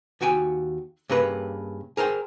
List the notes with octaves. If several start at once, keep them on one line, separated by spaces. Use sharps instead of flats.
D#2 F#4 G5 G#5
G2 C#3 A#3 B4
G#4 A#4 C5 G5